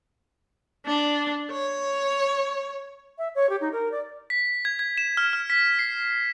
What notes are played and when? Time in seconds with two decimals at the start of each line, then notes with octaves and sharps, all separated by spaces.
0.86 D4
1.51 C#5
3.18 E5
3.35 C#5
3.50 G4
3.61 D#4
3.72 A#4
3.92 D5
4.30 B6
4.65 G#6
4.79 G#6
4.98 E7
5.17 F6
5.33 F6
5.50 B6
5.79 C7